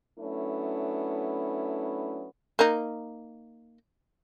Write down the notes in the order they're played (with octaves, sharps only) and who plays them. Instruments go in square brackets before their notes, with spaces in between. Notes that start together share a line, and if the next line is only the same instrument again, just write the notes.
[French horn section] F#3 A3 B3 C#4 D4 E4
[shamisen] A#3 D#4